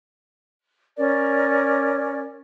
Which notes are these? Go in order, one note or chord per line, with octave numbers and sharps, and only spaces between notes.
C#4 A#4 D5